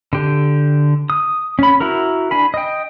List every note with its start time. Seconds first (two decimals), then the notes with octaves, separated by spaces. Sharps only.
0.13 D3 G4
1.10 D#6
1.59 C#4 B5
1.80 E4 F#4 A#4
2.31 D4 G#5 B5
2.54 D#5 G5